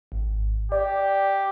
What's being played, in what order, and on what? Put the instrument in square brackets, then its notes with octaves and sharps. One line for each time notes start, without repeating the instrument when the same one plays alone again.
[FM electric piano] G#1
[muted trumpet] G4 [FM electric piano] D5